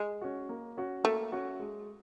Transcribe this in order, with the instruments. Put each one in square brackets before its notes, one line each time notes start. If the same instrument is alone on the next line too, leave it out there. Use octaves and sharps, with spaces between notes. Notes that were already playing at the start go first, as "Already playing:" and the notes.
Already playing: [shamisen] G#3
[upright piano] C#4 F#4
A#3
C#4 F#4
[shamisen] A3 [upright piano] A#3
[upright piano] C#4 F#4
G#3